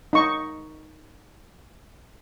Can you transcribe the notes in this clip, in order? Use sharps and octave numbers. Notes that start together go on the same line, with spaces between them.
D#4 C#6